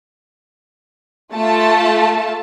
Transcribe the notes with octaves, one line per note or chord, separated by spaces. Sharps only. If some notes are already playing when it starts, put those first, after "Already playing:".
A3 F4 A5